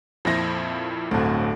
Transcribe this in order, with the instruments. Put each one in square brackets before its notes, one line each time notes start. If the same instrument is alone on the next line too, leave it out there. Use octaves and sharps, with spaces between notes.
[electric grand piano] F2 A#2 E4 [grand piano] F3 A#6
[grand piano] D1 D2 [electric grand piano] G1 C4